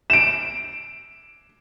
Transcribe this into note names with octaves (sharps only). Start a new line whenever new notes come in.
D7 E7